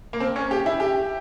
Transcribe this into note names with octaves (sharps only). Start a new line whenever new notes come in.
A#3
C4
C#4
G4
E4
G4